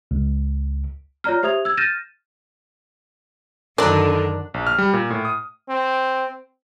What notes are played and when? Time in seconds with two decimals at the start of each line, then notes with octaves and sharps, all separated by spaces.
0.11 C#2
1.24 F4 C#5 D5 A#5 F6
1.43 G4 C5 E5 D#6 G#6 F7
1.65 E6 G#6
1.77 F6 G6 A6 A#6 D#7 E7
3.78 F#2 D3 D#3 F#3 D4 A4 A#4
4.54 A#1
4.67 F6
4.78 G3
4.93 A#2
5.10 A2
5.25 D#6
5.69 C4